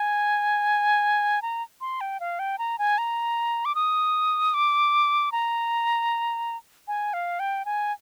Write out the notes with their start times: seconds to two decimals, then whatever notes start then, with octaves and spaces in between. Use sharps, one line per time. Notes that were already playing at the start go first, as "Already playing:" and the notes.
Already playing: G#5
1.42 A#5
1.81 C6
2.01 G5
2.20 F5
2.39 G5
2.59 A#5
2.79 G#5
2.98 A#5
3.65 D6
3.75 D#6
4.54 D6
5.32 A#5
6.88 G#5
7.13 F5
7.40 G5
7.65 G#5